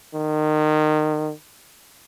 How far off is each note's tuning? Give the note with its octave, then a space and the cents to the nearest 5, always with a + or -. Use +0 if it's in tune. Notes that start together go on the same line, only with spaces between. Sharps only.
D#3 -25